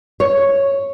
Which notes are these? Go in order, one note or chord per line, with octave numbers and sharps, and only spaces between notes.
C#5